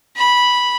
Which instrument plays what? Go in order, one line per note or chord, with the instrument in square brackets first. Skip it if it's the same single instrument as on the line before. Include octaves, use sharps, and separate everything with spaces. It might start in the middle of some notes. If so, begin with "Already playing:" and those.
[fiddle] B5